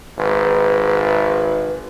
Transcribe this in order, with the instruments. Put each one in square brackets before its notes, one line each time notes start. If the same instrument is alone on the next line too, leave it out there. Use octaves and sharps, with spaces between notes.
[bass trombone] G#1 [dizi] B4